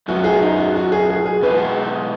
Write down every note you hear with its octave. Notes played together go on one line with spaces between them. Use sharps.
F#2 F#3 B3 F#4
G#4
D#4
F#4
F#4
G#4
G#4
G#4
B2 G#3 D#4 B4